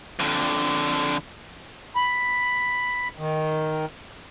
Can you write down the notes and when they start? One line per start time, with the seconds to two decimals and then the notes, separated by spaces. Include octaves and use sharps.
0.19 F2 D3
1.96 B5
3.18 D#3